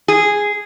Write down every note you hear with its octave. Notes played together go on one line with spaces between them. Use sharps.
G#4